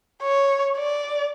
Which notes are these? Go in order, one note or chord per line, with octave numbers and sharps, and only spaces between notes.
C#5
D5